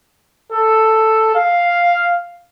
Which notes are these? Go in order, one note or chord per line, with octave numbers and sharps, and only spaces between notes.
A4
F5